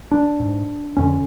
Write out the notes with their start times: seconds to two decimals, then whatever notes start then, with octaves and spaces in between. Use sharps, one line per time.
0.11 D4
0.40 G#2
0.97 F2 D3 C#4